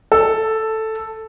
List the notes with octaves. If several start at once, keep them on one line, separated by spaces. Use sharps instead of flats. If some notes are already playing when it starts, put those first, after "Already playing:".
A4